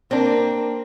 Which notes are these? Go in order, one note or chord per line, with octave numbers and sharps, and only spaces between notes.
A#3 C4 D4